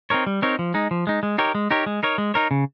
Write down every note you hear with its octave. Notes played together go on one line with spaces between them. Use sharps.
C4 D#4 A#4 C#5
G3
C4 D#4 A#4 C#5
F3
G#3 D#4
F3
G#3 D#4
G#3
D#4 G4 A#4 C#5
G#3
D#4 G4 A#4 C#5
G#3
D#4 A#4 C#5
G#3
D#4 A#4 C#5
C#3